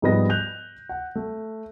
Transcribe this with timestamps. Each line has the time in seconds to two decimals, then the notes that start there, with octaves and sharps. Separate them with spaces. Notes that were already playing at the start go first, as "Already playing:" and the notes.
0.02 G#2 F3 G3 B3 D#5 A#6
0.29 F#6 G6 F7
0.89 F#5
1.15 A3